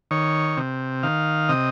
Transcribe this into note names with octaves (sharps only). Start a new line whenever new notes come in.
D#3 C#5
C3
D#3 F5
C3 D#5